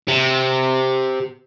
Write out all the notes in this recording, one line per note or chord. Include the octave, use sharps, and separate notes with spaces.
C3